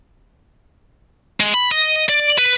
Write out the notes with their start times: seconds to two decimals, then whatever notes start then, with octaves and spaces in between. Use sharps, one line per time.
1.40 G#3
1.54 B5
1.71 D#5
2.09 D5
2.38 B4